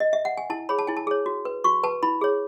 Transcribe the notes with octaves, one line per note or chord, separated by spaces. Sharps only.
D#5
E5
F#5
G#5
E4 A5
G#4 C#5 B5
A5
E4 G#5
A5
G#4 C#5
F#4
B4
F#4 C#6
B4 A5
E4 B5
G#4 C#5